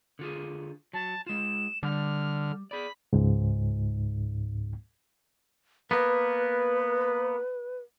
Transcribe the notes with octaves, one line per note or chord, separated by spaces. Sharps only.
D3 F4 G#4
F#3 A5
G#3 F4 E7
D3 G3 F6
G#4 D5 B5
C#2 G#2
A#3 B3 B4